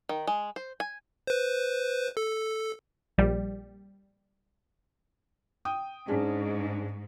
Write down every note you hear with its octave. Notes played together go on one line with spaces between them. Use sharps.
D#3
G#3
C5
G#5
B4 C5
A4
A#1 G3
G5 D#6
G#2 C#4 D4 G#4